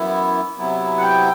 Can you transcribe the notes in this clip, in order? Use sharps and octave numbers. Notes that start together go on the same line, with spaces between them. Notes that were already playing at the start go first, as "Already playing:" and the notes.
Already playing: F#2 E3 B3 E4
C3 F#3 B3 E4
F#5
G5